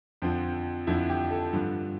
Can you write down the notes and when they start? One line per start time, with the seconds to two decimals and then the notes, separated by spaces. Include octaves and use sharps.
0.22 F2 D3 F3 C4
0.87 F2 D3 F3 E4
1.09 G4
1.31 A4
1.53 G2 D3 F3